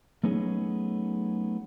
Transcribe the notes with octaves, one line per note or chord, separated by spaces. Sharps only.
F#3 A3 B3 C#4 D#4 G#4